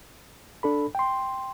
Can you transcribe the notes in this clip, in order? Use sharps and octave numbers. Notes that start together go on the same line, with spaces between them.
D4 A4 B5
G5 C6